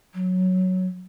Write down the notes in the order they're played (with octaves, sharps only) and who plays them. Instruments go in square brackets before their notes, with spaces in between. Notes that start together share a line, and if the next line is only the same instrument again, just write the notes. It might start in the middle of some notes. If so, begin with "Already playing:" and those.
[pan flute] F#3